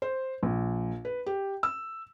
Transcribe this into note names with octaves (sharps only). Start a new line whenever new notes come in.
C5
A#1
B4
G4
E6